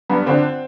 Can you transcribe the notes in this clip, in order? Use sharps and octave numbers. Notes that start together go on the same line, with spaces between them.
G2 B3
D3 C4